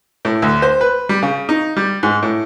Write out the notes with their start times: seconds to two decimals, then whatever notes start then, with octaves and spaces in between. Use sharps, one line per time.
0.25 A2
0.42 D2
0.62 C5
0.81 B4
1.09 G3
1.23 C#3
1.49 D#4
1.77 G3
2.03 G#2
2.23 A2